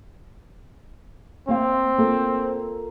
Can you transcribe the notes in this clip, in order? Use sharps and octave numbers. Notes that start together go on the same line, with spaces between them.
A#3 C4 F5
A#3 F4 A4